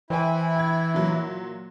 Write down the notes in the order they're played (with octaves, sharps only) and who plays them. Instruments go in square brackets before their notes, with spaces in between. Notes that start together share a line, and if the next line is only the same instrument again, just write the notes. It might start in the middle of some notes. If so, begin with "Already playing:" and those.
[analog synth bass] E3 [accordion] E4 [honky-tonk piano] C5 G5 G#5
[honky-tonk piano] G5 G#6
A#2 F#3